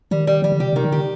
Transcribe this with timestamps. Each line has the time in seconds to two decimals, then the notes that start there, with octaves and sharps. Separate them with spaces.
0.11 D#3 G3
0.27 G3
0.42 D#3 G3
0.52 D3
0.60 C3 G4
0.72 C3 D#3
0.85 D3
0.92 G4